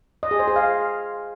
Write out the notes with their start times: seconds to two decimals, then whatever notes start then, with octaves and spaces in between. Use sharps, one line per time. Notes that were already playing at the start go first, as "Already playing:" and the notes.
0.23 D#5
0.31 G#4
0.39 C5
0.48 G#4
0.56 F5